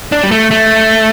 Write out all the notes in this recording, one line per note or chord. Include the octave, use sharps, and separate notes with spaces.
D4
G3
A3
A3